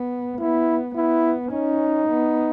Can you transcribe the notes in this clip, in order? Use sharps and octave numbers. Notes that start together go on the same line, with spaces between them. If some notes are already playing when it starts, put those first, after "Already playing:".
Already playing: B3
B3 E4
B3 E4
C#4 D#4
B3